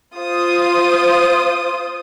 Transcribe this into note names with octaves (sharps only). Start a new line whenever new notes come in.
F4 C5 D#6